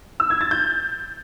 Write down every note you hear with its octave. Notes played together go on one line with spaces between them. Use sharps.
E6
G#6
A6
G6